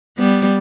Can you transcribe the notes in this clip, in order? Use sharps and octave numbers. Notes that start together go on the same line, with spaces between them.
G3 B3